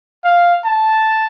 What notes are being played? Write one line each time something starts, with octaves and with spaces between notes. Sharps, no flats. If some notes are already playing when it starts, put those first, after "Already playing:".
F5
A5